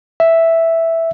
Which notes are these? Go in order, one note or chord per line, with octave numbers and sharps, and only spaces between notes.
E5